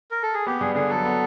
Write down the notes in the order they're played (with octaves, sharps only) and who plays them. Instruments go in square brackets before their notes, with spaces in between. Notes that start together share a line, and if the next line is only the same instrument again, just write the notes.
[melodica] A#4
A4
G#4
[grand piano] B3 [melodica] G4
[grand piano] G2 [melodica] G#4
[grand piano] D3 [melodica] G#4
[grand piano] F#3 [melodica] A4
[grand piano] B3